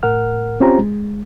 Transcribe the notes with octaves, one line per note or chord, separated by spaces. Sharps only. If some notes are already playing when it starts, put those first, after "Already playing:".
A2 A#4 F#5 F6
C4 C#4 F4 G4 C5 A#5
G#3